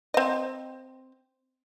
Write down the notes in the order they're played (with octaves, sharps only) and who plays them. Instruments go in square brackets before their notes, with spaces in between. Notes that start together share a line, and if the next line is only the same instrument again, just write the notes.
[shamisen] C4 D#5